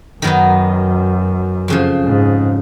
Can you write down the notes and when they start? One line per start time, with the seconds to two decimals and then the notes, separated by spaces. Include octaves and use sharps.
0.22 F#2 D#3 F#3 B3 D#4
1.68 F2 C#3 F3
2.05 G#2